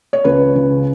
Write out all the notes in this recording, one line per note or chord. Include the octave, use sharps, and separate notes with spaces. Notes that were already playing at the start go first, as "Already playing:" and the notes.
C#5
C#2 B4
C#3